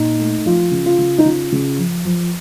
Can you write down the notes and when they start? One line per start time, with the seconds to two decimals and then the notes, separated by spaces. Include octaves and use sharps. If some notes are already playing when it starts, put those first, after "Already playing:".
Already playing: A#2 D#4
0.19 A3
0.46 F3 F4
0.72 C#3
0.86 F4
0.98 C#3
1.18 D#4
1.25 C#3 F4
1.52 C#3
1.78 F3
2.05 F3